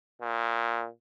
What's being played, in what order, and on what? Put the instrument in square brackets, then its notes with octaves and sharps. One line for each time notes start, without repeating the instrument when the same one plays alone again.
[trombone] A#2